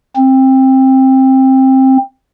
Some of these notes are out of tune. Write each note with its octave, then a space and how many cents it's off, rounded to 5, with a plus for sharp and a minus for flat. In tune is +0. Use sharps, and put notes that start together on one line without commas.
C4 +15